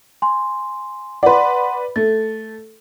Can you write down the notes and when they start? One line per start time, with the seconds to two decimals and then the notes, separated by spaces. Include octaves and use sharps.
0.22 G#5 C6
1.23 B4 D5 F#5 C6
1.96 A3 A6